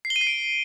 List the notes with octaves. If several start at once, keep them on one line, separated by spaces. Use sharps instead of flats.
C7
G7
D#7
C7
D7